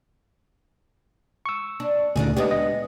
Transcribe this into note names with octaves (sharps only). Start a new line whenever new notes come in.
C#6 E6
D4
D2 A#2 C#3 D4 D#4 G#4
G#3 B3 D4 G4 D#5
D#5